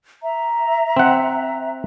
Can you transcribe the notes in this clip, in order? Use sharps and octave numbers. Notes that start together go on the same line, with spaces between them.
E5 A#5
C4 F#5